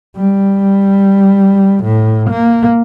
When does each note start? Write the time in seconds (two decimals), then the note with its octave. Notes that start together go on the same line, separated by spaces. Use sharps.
0.17 G3
1.84 A2
2.29 A#3